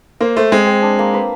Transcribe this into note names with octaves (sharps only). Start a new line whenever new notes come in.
A#3 C5
A3 C5
G#3 C4
C4
D4
A#3
B4